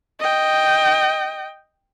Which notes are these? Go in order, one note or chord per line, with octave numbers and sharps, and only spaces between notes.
D#5 G5